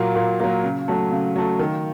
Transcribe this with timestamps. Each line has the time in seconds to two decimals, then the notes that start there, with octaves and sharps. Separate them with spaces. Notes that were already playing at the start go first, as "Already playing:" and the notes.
Already playing: A#2 F#3 A#3
0.16 A#2
0.40 F#3 A#3
0.64 C#3
0.88 F#3 A3
1.11 C#3
1.36 F#3 A3
1.59 D#3